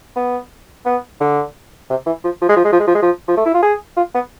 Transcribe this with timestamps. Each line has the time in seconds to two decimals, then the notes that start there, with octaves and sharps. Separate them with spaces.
0.16 B3
0.86 B3
1.21 D3
1.90 C3
2.06 E3
2.24 F3
2.42 F3
2.49 G#3
2.56 F3
2.64 G#3
2.72 F3
2.80 G#3
2.87 F3
2.95 G#3
3.02 F3
3.28 F3
3.37 A3
3.46 E4
3.54 F4
3.63 G#4
3.97 F4
4.14 B3